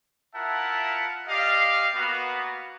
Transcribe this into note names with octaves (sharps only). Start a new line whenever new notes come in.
E4 F4 A#4 E5 F#5 A5
G4 D5 D#5 F5
A#3 B3 F#4